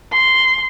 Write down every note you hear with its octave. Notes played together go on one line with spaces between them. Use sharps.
C6